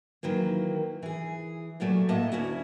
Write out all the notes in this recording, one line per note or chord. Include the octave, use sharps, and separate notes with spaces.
D#3 E3 F#3 A#3
E3 G#4
G2 A#2 F#3 A3 D5
A2 A#3 D#5 E5 A5
D2 C#4 E4 F#4